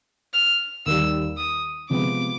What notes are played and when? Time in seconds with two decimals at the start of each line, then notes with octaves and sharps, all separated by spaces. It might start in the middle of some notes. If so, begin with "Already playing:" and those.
0.34 F6
0.86 D#2 D#3 G3 E6
1.37 D#6
1.90 C3 F3 G#3 B3 D6